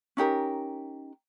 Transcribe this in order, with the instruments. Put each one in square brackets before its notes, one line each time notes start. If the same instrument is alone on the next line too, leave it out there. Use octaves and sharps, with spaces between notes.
[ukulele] C#4 D#4 G4 A#4